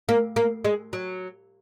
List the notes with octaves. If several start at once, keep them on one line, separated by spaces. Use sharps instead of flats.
A#3
A#3
G#3
F#3